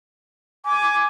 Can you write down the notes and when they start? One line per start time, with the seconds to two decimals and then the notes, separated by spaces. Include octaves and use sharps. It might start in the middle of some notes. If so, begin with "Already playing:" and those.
0.65 G#5 D6